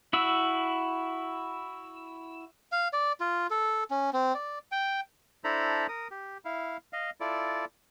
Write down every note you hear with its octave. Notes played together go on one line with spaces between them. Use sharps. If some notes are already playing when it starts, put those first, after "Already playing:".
E4 F#4 E6
F5
D5
F4
A4
C#4
C4
D5
G5
D4 E4 A4 C5 A#5 B5
A#4 D#6
G4
E4 F5
D#5 F5
E4 F4 A4 D5